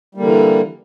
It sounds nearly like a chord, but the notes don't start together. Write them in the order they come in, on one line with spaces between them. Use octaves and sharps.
G3 A#3 D3 E3